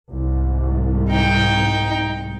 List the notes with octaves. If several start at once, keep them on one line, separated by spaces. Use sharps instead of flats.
C2 G#2
D#4 G5